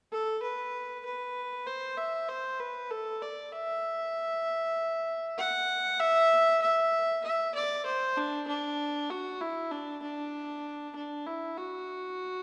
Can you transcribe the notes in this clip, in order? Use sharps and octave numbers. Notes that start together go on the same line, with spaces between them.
A4
B4
B4
C5
E5
C5
B4
A4
D5
E5
F#5
E5
E5
E5
D5
C5
D4
D4
F#4
E4
D4
D4
D4
E4
F#4